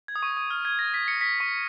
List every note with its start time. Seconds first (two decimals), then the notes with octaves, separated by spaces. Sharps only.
0.08 G#6
0.16 D#6
0.23 C#6
0.37 D#6
0.51 F6
0.65 G#6
0.79 A#6
0.94 B6
1.08 C#7
1.21 B6
1.40 C#6